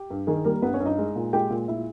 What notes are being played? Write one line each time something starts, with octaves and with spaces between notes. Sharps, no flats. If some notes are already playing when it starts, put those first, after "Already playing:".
Already playing: G4
G2
D#3 G#4
G3 A#3 A#4
G2 B3 B4
C#4 C#5
G2
D#4 D#5
G#3
A#2
G#3 G4 G5
A#2
G#3 E4 E5